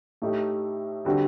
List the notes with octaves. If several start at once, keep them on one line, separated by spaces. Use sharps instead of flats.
A2 A3 D#4 G4
D3 G3 C4 F#4